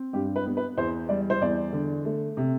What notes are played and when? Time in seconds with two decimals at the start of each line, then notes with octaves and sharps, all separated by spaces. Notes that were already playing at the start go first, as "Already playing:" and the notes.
Already playing: C4
0.13 G2 G4
0.36 B4
0.46 B3
0.57 B4
0.77 E2 C5
1.09 G3 D5
1.30 C5
1.41 E2 D5
1.73 D3
2.05 A3
2.37 C3